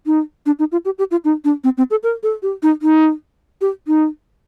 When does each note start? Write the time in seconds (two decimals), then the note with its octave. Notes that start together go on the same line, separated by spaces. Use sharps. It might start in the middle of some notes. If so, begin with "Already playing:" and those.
0.06 D#4
0.46 D4
0.59 D#4
0.72 F4
0.85 G4
0.98 G4
1.11 F4
1.24 D#4
1.45 D4
1.64 C4
1.78 C4
1.91 A4
2.03 A#4
2.23 A4
2.42 G4
2.63 D#4
2.82 D#4
3.61 G4
3.87 D#4